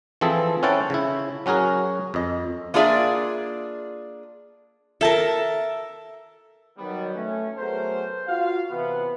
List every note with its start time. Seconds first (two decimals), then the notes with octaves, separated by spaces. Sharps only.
0.21 E3 F3 C4 G#4 A4
0.63 C#4 E4 C5 F#5 G5 A5
0.90 C#3 E4
1.46 F#3 C#4 F#4 G#4 A#4
2.14 F2 D#5
2.74 A#3 D4 F4 G#4 D5 E5
5.01 A4 A#4 E5 A5
6.78 D#3 F#3 G3 B3
7.15 A3 C#4
7.58 F#3 A3 B3 G#4 A#4 C5
8.28 F4 F#4 F5
8.70 C3 E3 B3